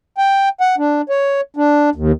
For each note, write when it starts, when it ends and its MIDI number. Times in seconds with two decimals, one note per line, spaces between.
0.18 0.49 79
0.61 0.75 78
0.78 1.02 62
1.09 1.41 73
1.57 1.90 62
1.95 2.12 39